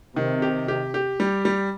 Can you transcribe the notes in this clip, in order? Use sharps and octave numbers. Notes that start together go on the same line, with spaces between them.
C3 D#3
G4
G4
G4
G3
G3